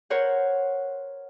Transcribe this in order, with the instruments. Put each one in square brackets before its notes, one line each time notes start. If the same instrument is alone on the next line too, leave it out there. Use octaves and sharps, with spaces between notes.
[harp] A#4 C5 C#5 F#5